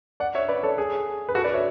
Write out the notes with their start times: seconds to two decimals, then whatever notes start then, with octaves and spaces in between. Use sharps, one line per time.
0.20 D5 F#5
0.35 C#5 E5
0.48 B4 D5
0.63 A4 C#5
0.78 G#4
1.29 B4
1.35 F#4 A4
1.44 B4 D5
1.53 C#5 E5